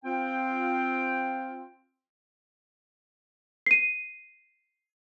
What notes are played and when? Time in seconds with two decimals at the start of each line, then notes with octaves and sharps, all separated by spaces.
0.04 C4 F4 G5
3.66 C7 D#7